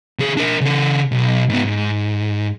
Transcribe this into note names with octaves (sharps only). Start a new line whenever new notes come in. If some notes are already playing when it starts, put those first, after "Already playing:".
D3 G#4
D4 A#4
C#3 A4
B1
G#2 B3
G#2